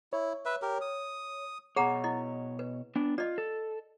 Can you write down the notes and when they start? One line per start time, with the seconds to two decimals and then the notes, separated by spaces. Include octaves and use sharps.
0.13 E4 C#5
0.45 B4 E5
0.62 G4 A#4
0.81 D#6
1.76 B2 G#4 C#5 F#5 A#5
2.04 E4 D#5
2.59 B4
2.96 B3 D4
3.18 F4 D5 D#5
3.38 A4